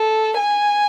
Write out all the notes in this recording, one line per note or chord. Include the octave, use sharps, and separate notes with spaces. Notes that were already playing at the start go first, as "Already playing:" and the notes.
Already playing: A4
G#5